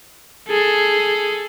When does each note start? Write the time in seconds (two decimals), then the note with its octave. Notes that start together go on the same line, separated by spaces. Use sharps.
0.47 G#4 A4